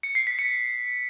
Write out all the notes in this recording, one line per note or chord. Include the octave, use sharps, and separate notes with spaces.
C#7
C7
B6
C#7